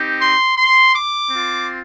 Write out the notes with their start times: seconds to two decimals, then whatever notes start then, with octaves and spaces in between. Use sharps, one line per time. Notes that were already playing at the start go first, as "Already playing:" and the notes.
Already playing: C4 D#4 G4
0.20 C6
0.57 C6
0.93 D6
1.30 C4 F4